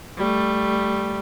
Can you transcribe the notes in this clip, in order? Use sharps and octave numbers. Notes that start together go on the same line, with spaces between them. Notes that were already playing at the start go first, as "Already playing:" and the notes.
G3 A3